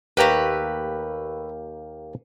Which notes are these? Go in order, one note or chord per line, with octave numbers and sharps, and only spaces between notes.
D#2 A3 G4 A#4 B4 F5 A#5